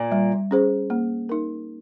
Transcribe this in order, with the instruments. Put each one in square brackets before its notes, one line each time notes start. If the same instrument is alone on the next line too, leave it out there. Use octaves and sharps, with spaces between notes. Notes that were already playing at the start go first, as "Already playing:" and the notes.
Already playing: [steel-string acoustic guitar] A#2
[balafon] G3
C#4 G#4 C5
A#3
D#4 A#4